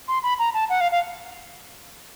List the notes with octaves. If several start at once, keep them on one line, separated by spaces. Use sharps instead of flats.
C6
B5
A#5
A5
F#5
F5
F5